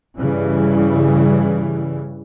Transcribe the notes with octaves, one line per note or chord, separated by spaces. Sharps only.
G2 C#3 E3 G3